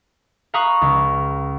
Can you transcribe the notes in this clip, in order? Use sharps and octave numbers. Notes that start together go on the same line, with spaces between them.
F5 A#5 B5 C#6 D#6 F#6
C#2